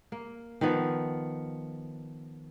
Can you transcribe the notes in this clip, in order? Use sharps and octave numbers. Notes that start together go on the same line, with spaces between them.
A#3
D#3 F3 B3